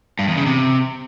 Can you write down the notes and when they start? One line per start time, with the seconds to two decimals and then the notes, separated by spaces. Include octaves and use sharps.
0.19 G2
0.28 E2
0.37 C#3
0.46 C3